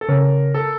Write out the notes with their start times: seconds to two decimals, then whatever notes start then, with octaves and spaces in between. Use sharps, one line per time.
0.01 A4
0.09 C#3 A#4
0.54 A4